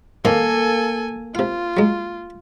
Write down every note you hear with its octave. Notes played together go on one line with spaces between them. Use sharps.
F2 D#3 A#3 A4 G#5
C3 F4 F5
F#3 G#3